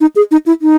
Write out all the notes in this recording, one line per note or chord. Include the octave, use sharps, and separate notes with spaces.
D#4
G#4
D#4
E4
D#4